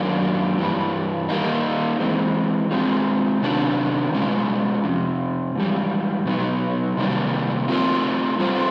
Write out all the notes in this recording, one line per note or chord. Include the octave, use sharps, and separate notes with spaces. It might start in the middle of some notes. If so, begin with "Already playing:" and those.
Already playing: F#2 D#3 F#3 A#3 D4
G2 E3 G3
D#3 G3 A#3 D#4
E3 G#3 C4
G#3 C4 F4 G#4
C3 D#3 F#3 B3 D4
B2 G#3 C#4 F4
F2 C3
G#2 E3 G3
B2 F#3 B3 D#4
C3 D#3 G3 A#3
A3 C4 F4 A#4
G3 C4 F4 A4 C5